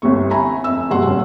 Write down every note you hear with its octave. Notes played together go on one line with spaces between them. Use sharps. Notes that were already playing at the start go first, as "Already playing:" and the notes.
G1 C2 C3 A3 C#6
E5 G#5 A#5 B5
F2 E5 E6
F#1 B1 G2 F#5 C6
D#1 C#4